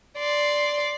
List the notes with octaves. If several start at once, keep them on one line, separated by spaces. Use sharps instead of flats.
D5 C6